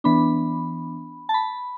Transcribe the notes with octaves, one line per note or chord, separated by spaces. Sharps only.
E3 B3 D4 B5
A5
B5